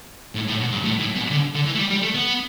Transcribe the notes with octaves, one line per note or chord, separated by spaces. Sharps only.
A2
A2
B2
G2
A2
A2
B2
D3
D3
E3
A3
G3
G3
A3
B3